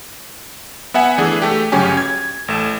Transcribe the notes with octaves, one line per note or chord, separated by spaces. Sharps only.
B3 E5 F#5 G#5
E3 A3 D4 G#4
A3 G4
G1 C#3 F#3 C#4 G4 G#5
G#6
A1 A3 E7